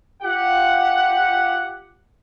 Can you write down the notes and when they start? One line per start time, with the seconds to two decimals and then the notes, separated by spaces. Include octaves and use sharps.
0.23 F4 G4 F#5